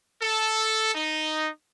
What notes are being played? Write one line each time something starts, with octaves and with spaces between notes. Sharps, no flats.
A4
D#4